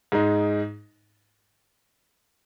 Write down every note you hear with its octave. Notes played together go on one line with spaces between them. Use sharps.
G#2 G#3 D#4